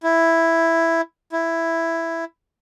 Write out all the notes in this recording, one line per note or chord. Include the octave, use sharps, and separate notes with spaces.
E4
E4